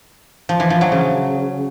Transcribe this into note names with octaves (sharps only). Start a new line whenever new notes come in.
F3
E3
F3
F#3
C#3